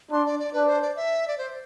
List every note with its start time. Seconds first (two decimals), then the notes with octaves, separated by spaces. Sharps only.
0.11 D4 C6
0.26 D5
0.40 D5
0.53 D4 B4
0.67 C5
0.82 D5
0.96 E5
1.28 D5
1.38 C5